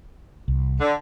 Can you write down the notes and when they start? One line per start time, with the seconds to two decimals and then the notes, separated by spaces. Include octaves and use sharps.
0.48 C2
0.80 D3